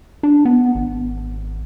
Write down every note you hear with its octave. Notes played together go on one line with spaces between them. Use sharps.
D4
B3
G#1